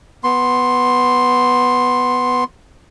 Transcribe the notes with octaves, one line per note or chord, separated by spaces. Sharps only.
B3 C6